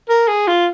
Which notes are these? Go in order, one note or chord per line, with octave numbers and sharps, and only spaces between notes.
A#4
G#4
F4